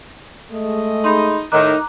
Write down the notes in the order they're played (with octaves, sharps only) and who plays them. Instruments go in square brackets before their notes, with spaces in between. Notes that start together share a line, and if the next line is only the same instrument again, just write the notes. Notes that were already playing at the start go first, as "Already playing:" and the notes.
[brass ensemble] G#3 A3 D#5
[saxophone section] D#4 [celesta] G#4 B5 C6
[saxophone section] A2 D#3 [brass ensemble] D#4 [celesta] A#5 D6 F#6